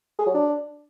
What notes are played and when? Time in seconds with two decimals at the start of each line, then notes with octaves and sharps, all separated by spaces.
0.19 G#4
0.26 F#3
0.34 D4